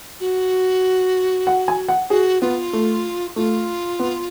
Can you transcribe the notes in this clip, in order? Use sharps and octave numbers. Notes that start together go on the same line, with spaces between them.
F#4
F#5
G#5
F#5
F#4 G#4
B3 F4
A3
A3 F4
B3